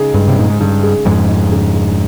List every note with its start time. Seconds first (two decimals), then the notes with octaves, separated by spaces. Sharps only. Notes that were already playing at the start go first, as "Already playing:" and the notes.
Already playing: C#3 G#3 D#4 G#4
0.14 G2 G#3
0.28 C3
0.37 A#2 D#4
0.50 G#2
0.61 G2 C#3
0.83 G#4
1.05 F2 G#2 G#3
1.29 D#4
1.52 C#3
1.75 G#4